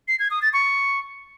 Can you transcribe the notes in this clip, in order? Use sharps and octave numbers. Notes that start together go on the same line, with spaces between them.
C7
G#6
D#6
A6
C#6